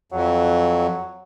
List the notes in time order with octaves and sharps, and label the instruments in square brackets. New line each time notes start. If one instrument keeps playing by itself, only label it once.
[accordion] F2 [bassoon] F#3